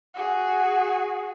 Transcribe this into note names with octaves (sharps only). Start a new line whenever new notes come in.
F#4 G#4